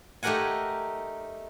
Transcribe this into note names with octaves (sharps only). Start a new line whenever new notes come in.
A3 D#4 G4 A#4 F#5 G#5